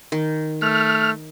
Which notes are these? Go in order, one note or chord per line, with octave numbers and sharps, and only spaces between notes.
D#3
A3 F6